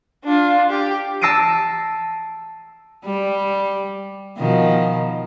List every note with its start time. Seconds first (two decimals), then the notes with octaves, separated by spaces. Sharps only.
0.25 D4 F4
0.70 G4
1.21 A5 E6 A#6 C7 D7 D#7
3.05 G3
4.38 B2 D#3 F3